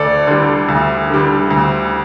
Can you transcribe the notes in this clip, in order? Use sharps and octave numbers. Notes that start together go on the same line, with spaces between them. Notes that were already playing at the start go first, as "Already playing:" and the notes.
Already playing: D2 A4 D5
D3 G3
D2
D3 G3
D2